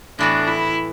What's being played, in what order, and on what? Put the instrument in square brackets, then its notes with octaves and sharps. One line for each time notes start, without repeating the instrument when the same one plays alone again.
[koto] A2 E3 B3 F#4 [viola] D4
[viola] E4